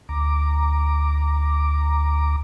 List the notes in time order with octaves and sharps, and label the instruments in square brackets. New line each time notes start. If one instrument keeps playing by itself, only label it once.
[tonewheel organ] D2 A#5 D6